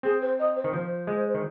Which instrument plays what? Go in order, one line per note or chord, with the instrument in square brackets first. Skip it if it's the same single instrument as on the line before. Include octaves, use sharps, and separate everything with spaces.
[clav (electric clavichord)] C4 [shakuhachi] G#4
[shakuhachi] C5
D#5
C5
[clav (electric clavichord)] D#3
[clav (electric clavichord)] F3 [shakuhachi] C5
[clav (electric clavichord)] G#3
D#3